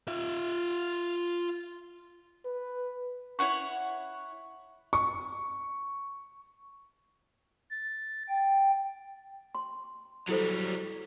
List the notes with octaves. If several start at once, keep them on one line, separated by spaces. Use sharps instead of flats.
F4 E5
B4
E4 C#5 F#5 C#6
C#6
A6
G5
C6
F#3 G3 E4 A4 C5